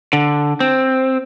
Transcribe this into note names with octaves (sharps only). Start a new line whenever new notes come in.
D3
C4